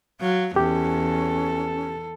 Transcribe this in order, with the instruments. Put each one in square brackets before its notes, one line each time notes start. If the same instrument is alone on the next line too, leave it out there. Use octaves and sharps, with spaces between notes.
[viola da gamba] F#3 [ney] F5
[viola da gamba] E2 [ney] C#4 [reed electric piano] G4 [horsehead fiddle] A4